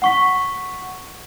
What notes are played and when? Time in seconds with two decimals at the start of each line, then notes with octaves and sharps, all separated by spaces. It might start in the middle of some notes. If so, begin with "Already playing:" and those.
0.02 F#5 C#6 B6